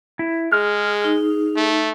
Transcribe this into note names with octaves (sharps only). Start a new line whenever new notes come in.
E4
G#3 G#4 F6
D#4
A3